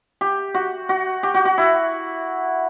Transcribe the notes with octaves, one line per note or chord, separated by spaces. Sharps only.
G4
F#4
F#4
G4
F#4
F#4
E4